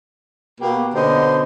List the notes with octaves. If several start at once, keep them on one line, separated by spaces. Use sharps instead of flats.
B2 A#3 G4
B2 D3 C#4 C5 D5 D#5